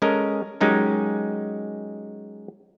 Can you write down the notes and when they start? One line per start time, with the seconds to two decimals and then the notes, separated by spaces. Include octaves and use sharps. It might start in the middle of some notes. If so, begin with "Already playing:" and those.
0.02 G#3 C#4 A4 A#4 D#5
0.61 F#3 G#3 C#4 D#4 G4 A#4